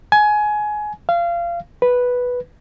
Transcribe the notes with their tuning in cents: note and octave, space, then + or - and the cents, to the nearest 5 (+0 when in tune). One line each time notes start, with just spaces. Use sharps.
G#5 +20
F5 -25
B4 -5